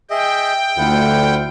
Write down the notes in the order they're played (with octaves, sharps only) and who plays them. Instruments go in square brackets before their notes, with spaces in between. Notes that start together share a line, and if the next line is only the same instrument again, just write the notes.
[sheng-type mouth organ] G#4 D#5 E5 [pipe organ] G5
[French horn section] D2 [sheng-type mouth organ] E4 F4 F#5